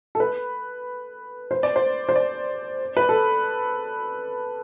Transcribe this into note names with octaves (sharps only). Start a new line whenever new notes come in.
A4
B4
C5
D5
C5
C5
D5
B4
A4